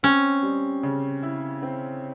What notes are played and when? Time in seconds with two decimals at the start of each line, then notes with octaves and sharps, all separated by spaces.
0.03 C4 C#4
0.43 G3
0.83 C#3
1.23 E4
1.62 C4